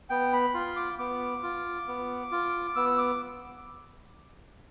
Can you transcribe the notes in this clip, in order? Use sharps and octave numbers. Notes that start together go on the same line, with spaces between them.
B3 G5
B5
F4 C6
D6
B3 D6
F4
B3
F4
B3 E6
D6